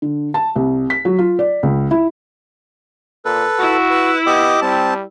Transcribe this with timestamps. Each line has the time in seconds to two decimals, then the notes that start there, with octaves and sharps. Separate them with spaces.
0.02 D3
0.34 A5
0.56 C2
0.90 B6
1.05 F#3
1.19 F4
1.39 D5
1.63 C#2
1.91 E4
3.25 A#2 A4 B4
3.59 E4 F#4
3.90 B4
4.26 B3 G4 D#5 D6
4.62 G3 C4 A5